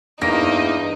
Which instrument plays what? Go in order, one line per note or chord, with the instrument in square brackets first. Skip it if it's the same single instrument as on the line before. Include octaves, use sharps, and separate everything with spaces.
[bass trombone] E2 [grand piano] G2 A#6 D7 [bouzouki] A#3 [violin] D#4